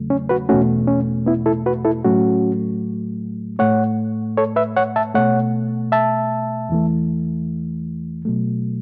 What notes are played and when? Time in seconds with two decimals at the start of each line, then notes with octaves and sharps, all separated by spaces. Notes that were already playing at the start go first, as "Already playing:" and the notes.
Already playing: E2 C#3 F#3 A3
0.10 C#4
0.29 F#4 B4
0.49 E2 B2 A3 C#4 F#4
0.88 C#4
1.26 B3 E4
1.46 E4 A4
1.66 F#4 B4
1.85 E4 A4
2.04 A2 F#3 A3 C#4 F#4
3.59 A2 A3 C#5 F#5
4.37 A4 C#5
4.56 B4 E5
4.76 C#5 F#5
4.96 E5 A5
5.14 B2 A3 C#5 F#5
5.92 E5 A5
6.69 E2 E3 A3
8.25 B2 F#3 A3